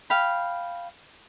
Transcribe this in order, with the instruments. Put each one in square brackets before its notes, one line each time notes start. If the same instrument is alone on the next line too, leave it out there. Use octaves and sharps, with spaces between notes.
[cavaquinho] F5 G5 B5